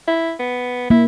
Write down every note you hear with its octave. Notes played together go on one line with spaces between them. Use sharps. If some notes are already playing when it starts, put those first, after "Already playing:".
E4
B3
A#3 E4